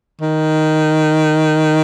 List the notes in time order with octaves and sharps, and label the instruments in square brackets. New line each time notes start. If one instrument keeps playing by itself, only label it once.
[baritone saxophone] D#3